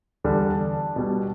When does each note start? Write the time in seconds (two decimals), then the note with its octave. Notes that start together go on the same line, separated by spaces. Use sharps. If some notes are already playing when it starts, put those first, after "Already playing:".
0.24 E2 D3 G3 D4
0.96 B2 G3